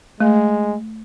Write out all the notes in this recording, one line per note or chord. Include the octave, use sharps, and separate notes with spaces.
G#3 A3